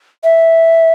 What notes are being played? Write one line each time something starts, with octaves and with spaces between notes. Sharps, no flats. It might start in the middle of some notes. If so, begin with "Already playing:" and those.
E5